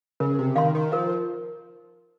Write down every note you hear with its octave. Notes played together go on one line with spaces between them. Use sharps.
C#3 A#4
C3
D#3 F5 C6
D#3
F3 A#4